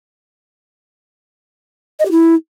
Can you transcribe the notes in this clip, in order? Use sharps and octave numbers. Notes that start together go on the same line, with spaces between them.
D#5
G4
E4